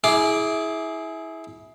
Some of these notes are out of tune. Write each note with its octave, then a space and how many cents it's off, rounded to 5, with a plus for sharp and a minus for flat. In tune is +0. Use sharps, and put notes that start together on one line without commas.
E4 -15 G#4 +15 D6 +0